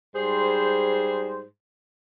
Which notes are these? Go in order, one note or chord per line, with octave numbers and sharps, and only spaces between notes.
G#2 G3 G#4 C5